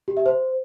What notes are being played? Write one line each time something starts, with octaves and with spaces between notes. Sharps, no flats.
G4
E5
C5